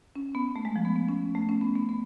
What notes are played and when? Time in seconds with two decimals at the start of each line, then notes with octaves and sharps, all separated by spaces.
0.15 C#4
0.35 B3
0.56 A3
0.65 G#3
0.76 F3
0.85 B3
0.96 B3
1.09 C#4
1.35 A3
1.49 C#4
1.61 B3
1.75 B3
1.89 B3